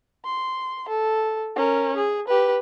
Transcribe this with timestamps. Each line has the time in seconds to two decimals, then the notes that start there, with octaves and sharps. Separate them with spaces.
0.25 C6
0.89 A4
1.56 C#4 A#4
1.97 G#4
2.28 G4 B4